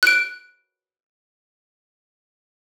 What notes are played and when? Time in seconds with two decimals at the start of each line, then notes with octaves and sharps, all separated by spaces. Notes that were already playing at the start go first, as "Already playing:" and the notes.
0.03 F#6 D7